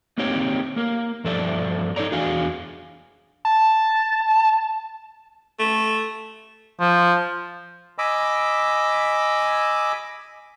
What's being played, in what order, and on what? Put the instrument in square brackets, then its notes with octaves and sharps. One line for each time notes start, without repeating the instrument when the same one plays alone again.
[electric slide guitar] A#3 C4 D#4 G4 C#5 G5
A#3 A#4
G2 F3 A4 D5 E5 A5
D#4 A4 C#5 D5 A#5
E2 D4 F#4 G#4 F5 G#5
[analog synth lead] A5
[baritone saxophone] A3
[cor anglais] F3
[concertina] D#5 G#5 B5 D6 E6